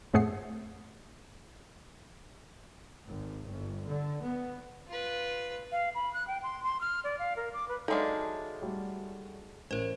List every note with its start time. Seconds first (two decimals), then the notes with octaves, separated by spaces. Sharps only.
0.14 F2 A2 A3 G#4 F#5 C7
3.07 G#1
3.49 G1
3.87 D3
4.22 B3
4.88 F4 B4
5.72 F5
5.95 B5
6.14 F#6
6.28 G5
6.43 C6
6.64 C6
6.81 F6
7.04 D5
7.19 F5
7.37 A#4
7.54 D6
7.68 B4
7.88 F#3 G#3 D4 D#4 A4 E5 F5 F6
8.62 G3 A3 F#4
9.71 A1 A#4 C5